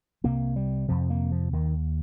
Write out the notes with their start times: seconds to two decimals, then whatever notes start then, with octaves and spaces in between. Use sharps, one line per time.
0.24 C2 C3 A#3
0.56 G3
0.88 F2 C3 F3
1.10 A#3
1.32 F3
1.53 D#2 D#3